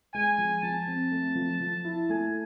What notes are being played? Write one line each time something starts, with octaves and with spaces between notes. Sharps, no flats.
G#3 G#5
F3
F3 A5
C4
A3
F3
F3
E4
A3 G#5